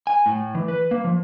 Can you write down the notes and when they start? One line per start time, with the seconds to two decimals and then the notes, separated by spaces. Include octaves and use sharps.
0.07 G#5
0.26 A2
0.55 E3
0.68 B4
0.91 A#3
1.04 F3